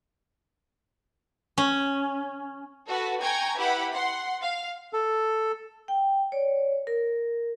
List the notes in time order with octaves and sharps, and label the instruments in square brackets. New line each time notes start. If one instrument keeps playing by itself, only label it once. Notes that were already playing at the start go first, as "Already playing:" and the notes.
[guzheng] C#4
[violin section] F#4 A4 B4 F#5
G5 G#5 A#5 C#6 G#6
E4 G4 B4 F#5 B5
F#5 C6
F5
[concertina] A4
[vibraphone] G5
C#5 D5
A#4